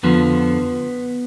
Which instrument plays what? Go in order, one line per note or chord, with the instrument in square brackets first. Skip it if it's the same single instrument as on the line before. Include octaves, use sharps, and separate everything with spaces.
[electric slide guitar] F2 D3 F3 B3